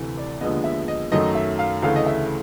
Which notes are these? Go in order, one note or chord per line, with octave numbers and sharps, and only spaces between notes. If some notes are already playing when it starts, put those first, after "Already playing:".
Already playing: D2 C3 E3 A3
D5
D#2 D3 F3 G#3 B3 D#5
E5
D#5
F#2 D#3 F#3 A3 D#5
E5
F5
D2 C#3 E3 A3 F5
D#5
E5